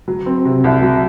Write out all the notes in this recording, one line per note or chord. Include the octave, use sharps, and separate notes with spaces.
F#3
C4
C3
C2
F#3